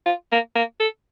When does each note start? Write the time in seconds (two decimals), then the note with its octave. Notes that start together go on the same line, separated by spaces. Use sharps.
0.06 F4
0.32 A#3
0.55 A#3
0.80 A4